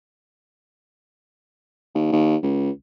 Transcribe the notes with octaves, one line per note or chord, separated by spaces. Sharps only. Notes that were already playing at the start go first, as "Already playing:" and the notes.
D#2
D#2
C#2